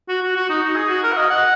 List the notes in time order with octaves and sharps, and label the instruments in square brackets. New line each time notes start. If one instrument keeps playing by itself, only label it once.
[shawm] F#4
F#4
F#4
D#4
D#4
G#4
F#4
A#4
F#5
D#5
F#5